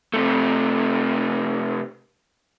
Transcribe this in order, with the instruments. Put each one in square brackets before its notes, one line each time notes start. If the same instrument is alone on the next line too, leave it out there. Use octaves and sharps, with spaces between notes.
[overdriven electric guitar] C3 A3